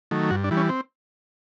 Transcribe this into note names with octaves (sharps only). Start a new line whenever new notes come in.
D#3 F#3 A3
G2 F#4
D4
E3 G3
C#4
C4